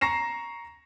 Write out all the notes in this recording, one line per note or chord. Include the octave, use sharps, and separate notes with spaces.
A#5 C#6 A#6 C7 E7